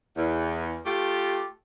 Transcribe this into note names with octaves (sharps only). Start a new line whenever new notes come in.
E2
A3 F4 G4